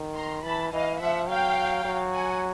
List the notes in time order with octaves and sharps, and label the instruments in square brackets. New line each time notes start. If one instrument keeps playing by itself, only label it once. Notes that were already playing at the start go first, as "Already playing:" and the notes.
Already playing: [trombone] D#3
[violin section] A#5 C6
[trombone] E3 [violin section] A5 B5
[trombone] E3 [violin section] D#5 F5
[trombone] F3 [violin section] E5 F#5
[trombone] F#3 [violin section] F5 G5
[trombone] F#3
[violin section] F#5 G#5